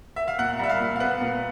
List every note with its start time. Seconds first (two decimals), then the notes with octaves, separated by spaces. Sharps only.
0.16 E5
0.28 F5
0.39 A#2 F#5
0.59 G3 E5
0.69 F5
0.80 A#2
0.96 F5
1.00 B3 F#5
1.21 A#2